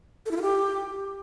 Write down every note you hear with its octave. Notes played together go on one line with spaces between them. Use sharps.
A4
E4
F4
G4